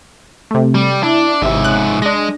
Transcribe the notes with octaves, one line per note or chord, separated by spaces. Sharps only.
C3 A3
G3
D4 E4
G#1 G#2 C3 E5
F#6
G#3 D4 A#6